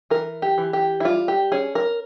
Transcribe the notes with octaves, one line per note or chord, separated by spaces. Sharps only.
E3 A#4
G4
E3
G4
E4
G3 F4
G4
C#4 G#4
A#4